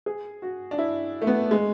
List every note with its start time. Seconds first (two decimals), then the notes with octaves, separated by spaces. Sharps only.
0.06 G#4
0.42 F#4
0.71 D4
0.78 E4
1.22 A3
1.27 B3
1.51 G#3